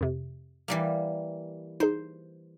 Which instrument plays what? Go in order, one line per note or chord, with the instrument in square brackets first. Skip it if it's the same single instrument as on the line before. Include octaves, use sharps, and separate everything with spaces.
[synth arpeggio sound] F2 C3
[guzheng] E3 G3 A#3
[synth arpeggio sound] D#4 G#4 [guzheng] C5